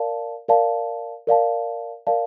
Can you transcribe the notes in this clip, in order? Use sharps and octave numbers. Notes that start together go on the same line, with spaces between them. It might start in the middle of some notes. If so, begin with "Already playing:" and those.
Already playing: A#4 D5 F5 A5
A#4 D5 F5 A5
A#4 D5 F5 A5
A#4 D5 F5 A5